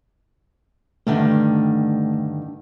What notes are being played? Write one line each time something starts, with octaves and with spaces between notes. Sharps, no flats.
G2 D3 D#3 A3